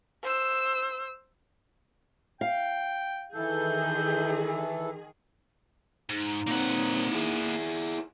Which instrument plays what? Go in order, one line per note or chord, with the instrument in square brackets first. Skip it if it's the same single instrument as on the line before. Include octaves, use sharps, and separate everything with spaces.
[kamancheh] C5 E6
[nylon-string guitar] F5 [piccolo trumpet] G5
[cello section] D#3 G#4 [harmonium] E3 A4 [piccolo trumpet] G6
[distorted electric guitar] G#2 [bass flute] D#4
[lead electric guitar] A#2 C4 [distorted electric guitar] A#3 F#5
[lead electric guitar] E4 G#4